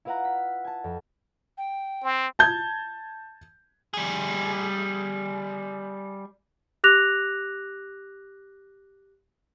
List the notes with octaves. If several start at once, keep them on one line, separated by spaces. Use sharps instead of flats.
E4 F4 B4 F5 F#5 A#5
B6
G#5 A5
F2
G5
C4
A5 G6 G#6
G3 G#4
G4 D6 F#6 A#6 F7